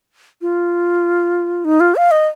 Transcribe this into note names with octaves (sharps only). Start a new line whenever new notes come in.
F4
D#4
F4
F5
D#5